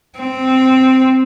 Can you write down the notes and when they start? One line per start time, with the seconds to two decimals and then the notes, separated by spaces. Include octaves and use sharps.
0.18 C4